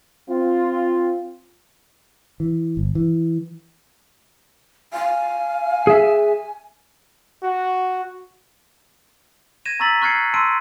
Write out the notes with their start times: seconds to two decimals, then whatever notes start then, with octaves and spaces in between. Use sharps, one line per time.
0.30 C4 F4
2.40 E3
2.77 G1
2.95 E3
4.93 F5 G#5
5.87 G#4 E5
7.43 F#4
9.65 G#6 A#6 D#7 E7
9.80 A#5 C#6 E6 A6 B6 F#7
10.02 C#6 F6 F#6 G#6 C7 C#7
10.34 A5 C6 E6 D7 D#7